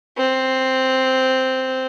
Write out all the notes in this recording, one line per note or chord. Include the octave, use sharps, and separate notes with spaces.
C4